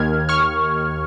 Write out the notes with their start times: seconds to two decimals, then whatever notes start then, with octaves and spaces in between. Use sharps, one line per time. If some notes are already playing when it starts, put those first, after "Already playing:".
Already playing: D#2 D#3 F6 G#6
0.29 C#6 F6